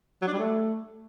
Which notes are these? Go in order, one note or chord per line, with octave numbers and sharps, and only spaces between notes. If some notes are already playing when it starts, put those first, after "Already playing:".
F#3
D4
G3
A3